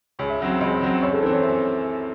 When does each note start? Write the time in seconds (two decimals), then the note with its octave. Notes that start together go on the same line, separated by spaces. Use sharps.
0.19 C#2 C#5
0.29 E5
0.40 C#3 F#3 C4 E5
0.50 E5
0.61 C#2 D#5
0.81 C#3 F#3 C4
1.02 F#2 C#5
1.13 A4
1.22 E3 C4 C5
1.33 C#5
1.43 F#2 E5